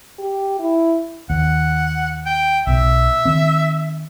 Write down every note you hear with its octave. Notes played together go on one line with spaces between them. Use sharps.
G4
E4
D#2 F#5
G5
B1 B2 E5
D#3 C4